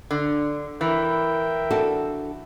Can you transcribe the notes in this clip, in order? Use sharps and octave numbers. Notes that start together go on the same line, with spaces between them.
D3
E3 A#4 E5 G5
D4 F#4 A4